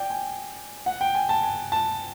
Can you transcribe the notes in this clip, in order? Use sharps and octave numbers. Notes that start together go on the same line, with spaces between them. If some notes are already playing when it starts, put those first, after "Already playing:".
Already playing: D5 G5
G#5
F#5
G5
G#5
A5
G#5
A5